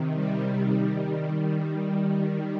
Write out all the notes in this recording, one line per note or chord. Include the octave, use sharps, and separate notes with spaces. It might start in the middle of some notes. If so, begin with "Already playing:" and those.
Already playing: C3 D#3
D#3 G3
D#3 G3